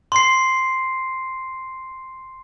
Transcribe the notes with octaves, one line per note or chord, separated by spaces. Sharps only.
C6 C7